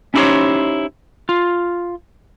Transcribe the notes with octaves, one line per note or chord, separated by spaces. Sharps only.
C#4 D#4 E4 G4 C5 C#5
F4